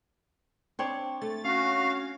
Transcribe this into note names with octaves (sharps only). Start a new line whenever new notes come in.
C4 D4 C#5
A3 A6
C#4 F#4 F5